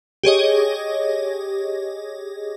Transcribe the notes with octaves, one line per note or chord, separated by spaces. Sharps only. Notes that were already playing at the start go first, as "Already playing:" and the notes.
G4 G#4 C#5 D#5